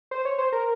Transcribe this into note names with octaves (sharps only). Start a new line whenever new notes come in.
C5
C#5
C5
A#4